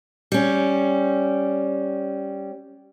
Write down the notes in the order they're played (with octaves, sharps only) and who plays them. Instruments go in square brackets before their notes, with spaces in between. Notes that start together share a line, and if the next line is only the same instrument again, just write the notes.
[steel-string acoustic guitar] G3 C#4